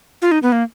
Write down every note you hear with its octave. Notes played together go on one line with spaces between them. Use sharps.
F4
D#4
B3
A#3